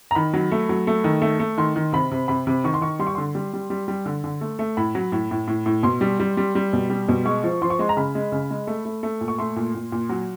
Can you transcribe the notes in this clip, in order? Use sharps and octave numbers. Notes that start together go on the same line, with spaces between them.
A#5
D#3 B5
F#3
A3
F#3
A3
D#3
A3
A3
D#3 C6
D#3
C3 B5
C3
C3 B5
C3
D#3 C#6
C6
D#3 C#6
G3 C6
C#6
D3 C6
G3
G3
G3
G3
D3
D3
A3
A3
A2 B5
F#3
A2
A2
A2
A2
B2 C6
G3
G3
G3
G3
B2
G3
B2
G#3 C#6
F3
F3 C6
C#6
G#3 C6
A#5
C#3 B5
G#3
C#3
G#3
A3
A3
A3
A#2
C#6
A3 C6
A#2
A#2
A#2
F#3